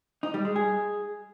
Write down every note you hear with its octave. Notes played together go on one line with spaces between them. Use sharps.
D#4
G3
G#3
G#4